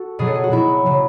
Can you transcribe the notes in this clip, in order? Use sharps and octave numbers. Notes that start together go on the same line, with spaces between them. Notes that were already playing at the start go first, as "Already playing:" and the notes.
Already playing: F#4 A4
B2 F#3 G#4
A4
G#4
F#4
B2 F#3 E4
C#3 F#3